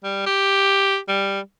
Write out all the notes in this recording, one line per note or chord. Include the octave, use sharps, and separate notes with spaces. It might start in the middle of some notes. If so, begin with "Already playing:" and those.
G3
G4
G3